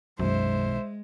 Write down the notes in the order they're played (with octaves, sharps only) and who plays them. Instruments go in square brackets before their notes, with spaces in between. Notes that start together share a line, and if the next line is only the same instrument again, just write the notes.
[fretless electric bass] B1 B2 D#3 [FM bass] F#2 [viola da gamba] G#3 [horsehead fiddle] C5 E5